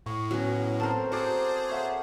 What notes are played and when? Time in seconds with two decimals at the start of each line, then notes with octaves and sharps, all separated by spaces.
0.06 A2 C#6
0.31 F#3 B3 C#4
0.80 C4 A4 A#4 C5
1.12 C4 F#4 G#4 C5 D5
1.69 C#5 E5 F#5